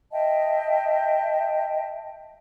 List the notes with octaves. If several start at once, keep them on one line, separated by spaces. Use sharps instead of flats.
D#5 E5 G5 A5